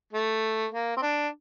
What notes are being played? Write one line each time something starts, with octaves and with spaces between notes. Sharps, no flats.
A3
A#3
C4
D4